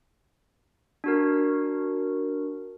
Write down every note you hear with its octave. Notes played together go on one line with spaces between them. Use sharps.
D4 F#4 A#4